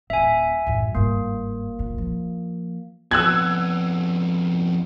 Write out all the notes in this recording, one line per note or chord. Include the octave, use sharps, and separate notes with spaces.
D1 C4 E5 G#5
A1 F#2
G1 G#2 A#3
A#1 F2
F3
F2 B3 E6 F#6 G#6